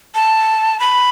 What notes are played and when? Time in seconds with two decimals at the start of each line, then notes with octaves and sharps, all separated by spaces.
0.15 A5
0.80 B5